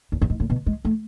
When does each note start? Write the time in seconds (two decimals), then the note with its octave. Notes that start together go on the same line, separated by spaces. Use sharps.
0.12 E2
0.22 F#2
0.30 G#2
0.40 A2
0.50 B2
0.66 G#3
0.85 A3